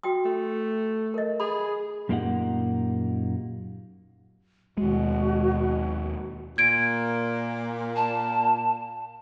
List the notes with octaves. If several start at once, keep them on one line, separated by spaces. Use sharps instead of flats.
F#4 G5 D#6
A3
A#4 D#5
G#4 B5
F#2 A#2 A#3 D#4 G4 F#5
D#2 B2 G#3 F#4
A#2 G#6 D7
A5